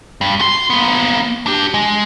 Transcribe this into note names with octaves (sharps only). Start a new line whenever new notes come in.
G2
F#4 C6
A#3 B3
D4 G4
G#3